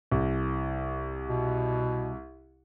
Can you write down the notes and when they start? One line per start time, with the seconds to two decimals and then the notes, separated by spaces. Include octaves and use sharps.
0.11 C2
1.28 B2